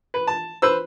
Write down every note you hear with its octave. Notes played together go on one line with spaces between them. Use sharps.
B4
A5
B4 C5 E6